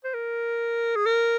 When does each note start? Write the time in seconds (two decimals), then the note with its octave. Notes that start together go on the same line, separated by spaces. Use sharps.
0.04 C5
0.14 A#4
0.96 G#4
1.06 A#4